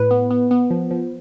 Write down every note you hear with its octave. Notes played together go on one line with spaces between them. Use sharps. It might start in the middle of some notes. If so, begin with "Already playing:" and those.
Already playing: A2 B4
B3
B3
B3
F3
F3